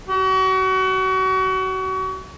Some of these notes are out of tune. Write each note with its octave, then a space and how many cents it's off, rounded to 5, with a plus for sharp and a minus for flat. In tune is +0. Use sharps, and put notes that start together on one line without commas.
F#4 +30